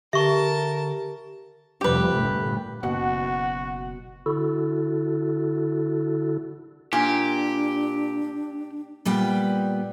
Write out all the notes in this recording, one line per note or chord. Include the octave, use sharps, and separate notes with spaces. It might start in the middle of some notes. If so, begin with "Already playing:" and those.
D3 G4 A#4 E5 A5 C#6
F1 F3 G3 G4 B4
G1 A#2 A3
F#1 B2 F#4 F#5
D3 E4 F#4 A4
A#2 D4 G4 G#5
A#2 G3 B3 G5